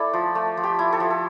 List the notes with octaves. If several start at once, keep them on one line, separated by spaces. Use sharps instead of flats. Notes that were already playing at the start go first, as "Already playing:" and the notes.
Already playing: A3 E4 A4 D5
F3
A3
F3
G4
E4
A4
F3
A4